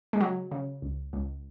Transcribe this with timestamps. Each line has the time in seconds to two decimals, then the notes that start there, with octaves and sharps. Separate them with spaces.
0.13 G#3
0.20 C#3 F#3
0.51 C#3
0.82 C#2
1.13 C#2